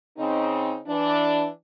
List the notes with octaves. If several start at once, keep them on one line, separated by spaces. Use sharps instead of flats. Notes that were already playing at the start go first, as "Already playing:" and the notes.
C#3 C4 D#4
E3 D4